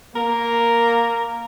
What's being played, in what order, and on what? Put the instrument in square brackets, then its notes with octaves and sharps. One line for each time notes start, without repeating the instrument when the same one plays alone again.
[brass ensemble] A#3 [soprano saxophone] A#4